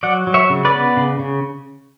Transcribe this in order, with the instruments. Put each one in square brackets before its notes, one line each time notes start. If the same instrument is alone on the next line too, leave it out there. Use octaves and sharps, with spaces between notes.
[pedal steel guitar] F#3 D5 F#5
F#3
C#5 E5
C#3
B4 D5
B3
C#3
C#3